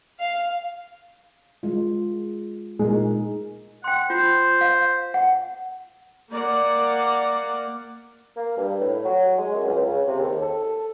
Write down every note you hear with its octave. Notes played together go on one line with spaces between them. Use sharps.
F5
G#3 F4
A#2 G#3 D#4 A#4
F#5 G5 C6
F4 C5
F5
F#5
A#3 D5 F#5
A#3
G2
A2
F#3
G#3
F#2
C#2
C#3
C3
D#2
A4